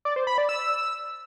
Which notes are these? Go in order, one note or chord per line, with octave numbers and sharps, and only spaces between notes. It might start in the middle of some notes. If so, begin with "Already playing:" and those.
D5
C5
B5
D5
E6